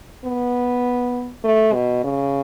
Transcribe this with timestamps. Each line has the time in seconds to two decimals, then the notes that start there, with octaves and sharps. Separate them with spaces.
0.25 B3
1.44 A3
1.73 B2
2.04 C#3